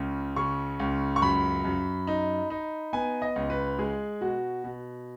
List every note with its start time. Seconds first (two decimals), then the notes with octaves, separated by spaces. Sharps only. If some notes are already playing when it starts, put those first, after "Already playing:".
Already playing: C#2 C#3
0.36 C#3 C#6
0.80 C#2
1.16 C#6
1.22 F#2 B5
1.65 F#2
2.07 D#4
2.50 D#4
2.93 B3 G#5
3.22 D#5
3.36 C#2
3.50 B4
3.79 G#3 G#4
4.21 B2 F#4
4.64 B2